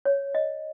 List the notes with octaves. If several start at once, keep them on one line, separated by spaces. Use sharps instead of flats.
C#5
D#5